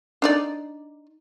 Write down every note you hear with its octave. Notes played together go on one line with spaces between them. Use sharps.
D4 D#4 D5